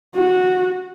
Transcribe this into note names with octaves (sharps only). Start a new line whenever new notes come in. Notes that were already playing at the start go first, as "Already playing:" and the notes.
F#4